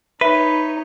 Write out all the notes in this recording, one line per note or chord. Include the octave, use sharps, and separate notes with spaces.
D#4 B4 C#5 E5 G7